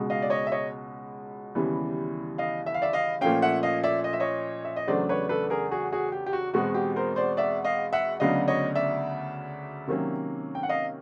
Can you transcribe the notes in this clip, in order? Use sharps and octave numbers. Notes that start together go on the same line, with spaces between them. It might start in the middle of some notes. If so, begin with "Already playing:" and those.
Already playing: C#2 B2 G#3
D#5 F5
D5
C#5 D#5
E5
C#5 D#5
D#2 C#3 E3 G3 B3
D#5 F5
E5
F5
D5 E5
D#5 F5
A#2 F3 A3 C#4 F5 G5
E5 F#5
D#5 F5
D5 E5
D#5
E5
C#5 D#5
E5
D#5
E2 C#3 F#3 A3 D4 C5 D5
B4 C#5
A4 B4
G#4 A#4
F#4 G#4
F#4 G#4
G4
G4
F#4
E2 B2 G#3 C4 F#4
G4
A#4 C5
C5 D5
D5 E5
D#5 F5
E5 F#5
D2 C#3 F#3 B3 D4 D#5 F5
C#5 D#5
D5 E5
C3 D#3 F#3 A#3 C#4
G5
F#5
D#5 F5